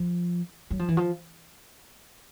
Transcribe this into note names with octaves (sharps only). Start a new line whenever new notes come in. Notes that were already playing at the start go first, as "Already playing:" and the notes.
Already playing: F3
F#3
F3
E3
F3